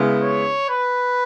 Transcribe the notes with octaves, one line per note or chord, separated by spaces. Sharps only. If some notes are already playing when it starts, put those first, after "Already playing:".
Already playing: C#3 G#3 B3 E4
C#5
B4